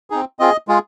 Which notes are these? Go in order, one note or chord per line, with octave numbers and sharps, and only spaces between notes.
C4 D#4 G#4
C4 F4 G#4 D#5
G#3 F4 G#4